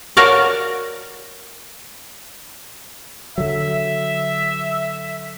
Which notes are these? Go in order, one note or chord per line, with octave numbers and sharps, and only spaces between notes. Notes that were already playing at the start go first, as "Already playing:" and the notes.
F#4 A#4 C#5 D5 F5
D3 F#3 E5